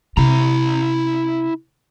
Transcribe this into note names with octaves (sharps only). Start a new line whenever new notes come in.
C3 E4 A#5